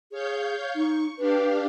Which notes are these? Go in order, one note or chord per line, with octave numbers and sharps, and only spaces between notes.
G#4 C#5 F5 G6
D#4 C#6
D4 G4 B4 F5